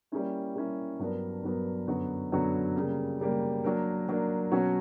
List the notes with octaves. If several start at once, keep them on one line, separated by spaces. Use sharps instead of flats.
G3 A#3 C#4 E4
G3 A#3 C#4 E4
G2 F#3 B3 D4 A#4
G2 F#3 B3 D4 A#4
F#2 D3 F#3 B3 F#4
F#2 D3 F#3 B3 F#4
C#3 G3 A#3
C#3 G3 A#3
F#3 A#3 D4 A#4
F#3 A#3 D4 A#4
B2 F#3 C#4 F#4 C#5